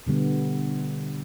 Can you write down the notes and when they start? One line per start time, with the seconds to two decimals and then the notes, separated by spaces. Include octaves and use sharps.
0.07 B2 D3 G3 B3